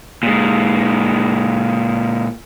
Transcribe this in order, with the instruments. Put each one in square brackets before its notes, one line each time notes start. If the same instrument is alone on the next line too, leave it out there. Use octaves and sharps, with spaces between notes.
[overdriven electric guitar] A#2 G#3